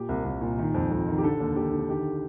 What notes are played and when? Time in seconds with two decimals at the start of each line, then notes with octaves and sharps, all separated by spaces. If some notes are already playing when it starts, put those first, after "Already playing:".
Already playing: A#2 G4
0.09 C2
0.24 C2
0.41 A#2
0.58 D#3
0.74 F2
0.91 F2
1.07 D#3
1.18 G4
1.23 D3 A4
1.40 D#2
1.56 D#2 G4
1.73 D3
1.89 D#3 G4